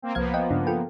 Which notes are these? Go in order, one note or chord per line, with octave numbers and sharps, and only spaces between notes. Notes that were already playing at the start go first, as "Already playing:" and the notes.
A#3 C4
C2 F3 A#3 B3 F5 G#6
D#5 G5
G2 C#3 D4
F4 A4 G5